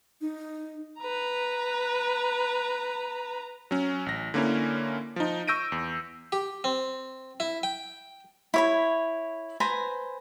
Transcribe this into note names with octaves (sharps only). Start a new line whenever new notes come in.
D#4
B4 A#5
F#3 C#4
A1 A#6
D3 A#3 C#4 E4 A#4
F3 D#4
C#6 E6 G6 A#6 D7 D#7
E2
G4
C4
E4
G5
E4 C#5 B5
B4 C5 G#5 A#5